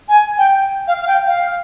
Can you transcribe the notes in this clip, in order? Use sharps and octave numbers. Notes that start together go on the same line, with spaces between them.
G#5
G5
F5
F5
G5
F5